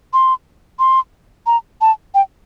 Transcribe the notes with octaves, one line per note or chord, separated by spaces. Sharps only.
C6
C6
A#5
A5
G5